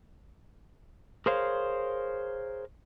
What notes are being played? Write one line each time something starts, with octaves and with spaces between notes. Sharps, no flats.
G#4 A#4 C5 C#5 F5